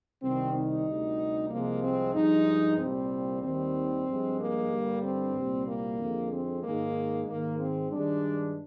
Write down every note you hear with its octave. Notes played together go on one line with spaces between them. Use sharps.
C2 C3 D#3 G3 C4
D#4
D2 C3 G3
C2 C3 F3 G#3 A#3
C4
G2 F3 G#3 D#4
C2 A#2 G3 C4
D#2 D#3 G3 C4
G2 F3 G#3
A#3
G2 D3 G3
C4
C2 A#2 G3
A#3
F2 D3 G#3
C4
G#2 D#3 G#3 A#3
G#2 D#3 G#3 A#3
C4
G2 D#3 G#3 D4